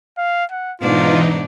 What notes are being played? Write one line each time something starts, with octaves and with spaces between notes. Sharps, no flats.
F5
F#5
G#2 B2 E3 D4 D#4 F4